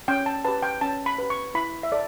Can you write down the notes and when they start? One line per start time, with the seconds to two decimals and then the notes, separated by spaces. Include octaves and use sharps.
0.08 C#4 G5
0.26 A5
0.45 G4 B4 A5
0.63 G5
0.81 C#4 A5
1.06 B5
1.19 G4 B4
1.30 C#6
1.55 E4 B5
1.83 E5
1.92 A4 D5